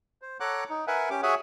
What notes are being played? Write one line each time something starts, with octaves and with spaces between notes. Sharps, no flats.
C5
A4 C#5 F#5 A#5 D6 F#6
D#4
A#4 B4 E5 F#5 G#5
C#4 G4 D6
F#4 G#4 C#5 E5 F#5 G#5